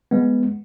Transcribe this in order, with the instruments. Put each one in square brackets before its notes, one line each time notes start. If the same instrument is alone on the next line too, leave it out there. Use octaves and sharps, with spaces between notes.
[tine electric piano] G#3 B3